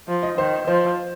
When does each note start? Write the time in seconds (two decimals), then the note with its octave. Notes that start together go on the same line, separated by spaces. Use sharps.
0.08 F3
0.23 D#5
0.38 D#3 C5
0.67 F3 C5